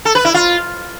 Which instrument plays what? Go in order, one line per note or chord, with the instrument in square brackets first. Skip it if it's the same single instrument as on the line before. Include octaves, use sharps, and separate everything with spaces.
[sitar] A4
B4
E4
F4